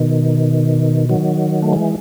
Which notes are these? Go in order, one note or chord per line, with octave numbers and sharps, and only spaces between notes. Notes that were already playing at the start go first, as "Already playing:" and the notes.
Already playing: B2 D#3
D#3 F#3
A3
E3 G#3